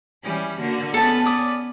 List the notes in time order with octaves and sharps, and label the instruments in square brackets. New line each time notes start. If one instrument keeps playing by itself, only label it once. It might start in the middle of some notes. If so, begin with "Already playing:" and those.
[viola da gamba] E3 G3 C#4
D3 A#3 F#4
[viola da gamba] B3 C#4 [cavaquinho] A4 A5
[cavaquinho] D5 D#6